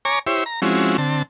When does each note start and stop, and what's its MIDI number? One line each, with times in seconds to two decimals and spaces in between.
0.05 0.19 73
0.05 0.19 80
0.05 0.19 82
0.05 0.19 85
0.05 0.19 86
0.27 0.44 64
0.27 0.44 67
0.27 0.44 72
0.27 0.44 73
0.27 0.44 76
0.46 0.60 82
0.62 0.97 53
0.62 0.97 56
0.62 0.97 60
0.62 0.97 61
0.62 0.97 64
0.62 0.97 66
0.98 1.22 50
0.98 1.22 60
0.98 1.22 81